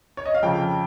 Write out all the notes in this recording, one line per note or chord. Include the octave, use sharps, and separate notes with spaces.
C#5
D#5
F5
F2 C#3 F3 G5